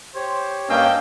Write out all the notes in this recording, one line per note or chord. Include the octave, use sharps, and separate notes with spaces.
G4 C5 C#5
G2 A#3 C#4 D4 D#5 F5 G5 E6